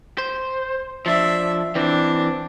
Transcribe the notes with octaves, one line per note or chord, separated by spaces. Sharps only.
C5
F3 D4 E5
E3 C4 D4